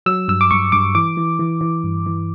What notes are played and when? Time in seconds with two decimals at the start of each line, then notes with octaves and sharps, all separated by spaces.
0.06 F#3 E6
0.28 G2 E6
0.41 D6
0.51 G2 C#6
0.72 G2 D6
0.95 E3 D6
1.17 E3
1.39 E3
1.61 E3
1.84 G2
2.06 E3